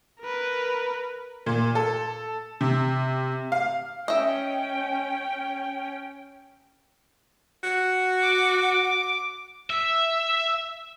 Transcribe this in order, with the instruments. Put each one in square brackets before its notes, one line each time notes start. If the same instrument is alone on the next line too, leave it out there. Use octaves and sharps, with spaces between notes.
[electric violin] A#4 B4
[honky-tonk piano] A#2
A4
C3
F5
[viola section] C#4 G5 [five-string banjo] D#5 E5
[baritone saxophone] F#4
[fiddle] D6
[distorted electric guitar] E5